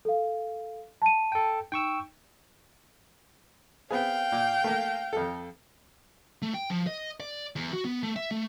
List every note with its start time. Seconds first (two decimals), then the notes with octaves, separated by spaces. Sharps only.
0.05 A4 F5
1.02 A5 D#7
1.32 A4 G5
1.72 D#4 G5 C#6 E6
3.91 B3 C4 G#4 F5 G5
4.32 A#2
4.64 A3 A#3
5.13 F2 A4
6.42 A3
6.54 G5
6.70 F3
6.87 D#5
7.20 D5
7.56 E2
7.73 F#4
7.85 B3
8.03 A3
8.16 E5
8.31 A3